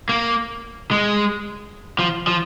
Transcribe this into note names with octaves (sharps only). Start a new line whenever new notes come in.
A#3
G#3
F3
F3